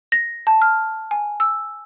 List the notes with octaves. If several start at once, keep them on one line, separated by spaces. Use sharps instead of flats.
A#6
A5
F6
G#5
E6